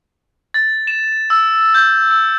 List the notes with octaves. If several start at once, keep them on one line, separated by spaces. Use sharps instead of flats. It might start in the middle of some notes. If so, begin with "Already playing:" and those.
A6
E7
E6
G6
E6